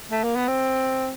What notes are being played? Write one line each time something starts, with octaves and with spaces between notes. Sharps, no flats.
A3
A#3
B3
C4